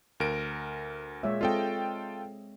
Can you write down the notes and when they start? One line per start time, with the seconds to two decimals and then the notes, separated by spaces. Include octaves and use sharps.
0.20 D2 A#4 D7
1.23 A#2 G#3 C#5 E5
1.41 G#3 C4 F4 A4 D#5 G5